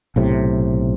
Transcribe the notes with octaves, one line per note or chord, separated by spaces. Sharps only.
B1 A2 C3